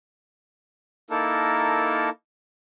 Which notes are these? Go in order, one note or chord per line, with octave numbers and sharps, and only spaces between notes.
A#3 D#4 E4 A4 A#4 A5